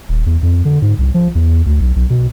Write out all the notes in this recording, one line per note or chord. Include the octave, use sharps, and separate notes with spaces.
D#1
E2
F2
D3
G#2
C2
F3
E2
D2
B1
B1
B2